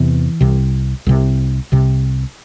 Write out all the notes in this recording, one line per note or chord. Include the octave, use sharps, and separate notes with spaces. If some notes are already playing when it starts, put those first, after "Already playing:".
Already playing: E2 C3 E3
C2 C3
C2 C3
C2 C3